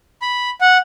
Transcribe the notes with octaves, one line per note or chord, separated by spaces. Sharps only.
B5
F#5